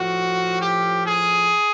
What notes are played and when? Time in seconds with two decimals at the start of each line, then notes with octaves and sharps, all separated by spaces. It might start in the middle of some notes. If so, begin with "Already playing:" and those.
Already playing: A2 F3 F#4
0.58 G4
1.04 G#4